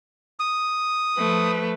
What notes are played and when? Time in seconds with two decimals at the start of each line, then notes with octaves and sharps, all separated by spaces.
0.40 D#6
1.16 F3 A3 B4